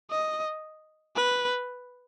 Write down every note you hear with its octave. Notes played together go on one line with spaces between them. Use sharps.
D#5
B4